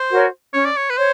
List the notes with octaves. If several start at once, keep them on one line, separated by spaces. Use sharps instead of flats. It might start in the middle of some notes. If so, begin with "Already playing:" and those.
Already playing: C5
F#4 A#4 C#5
C#4 C#5
D5
C#5
B4
C5 C#5